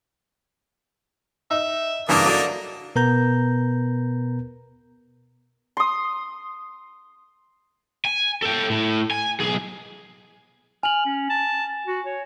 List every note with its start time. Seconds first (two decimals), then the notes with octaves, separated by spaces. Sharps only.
1.51 D#4 E5
2.09 G2 C#3 E3 A#3 D4 D#5
2.25 D3 F#3
2.96 B2 B3 A#4 B4 A#5 G6
5.77 C6 D#6
8.05 G#5
8.42 A4 G5
8.70 A2
9.11 G#5
9.40 B1 G#4
10.83 G#5 F6 F#7
11.05 C#4
11.30 A5
11.87 F#4
12.06 C#5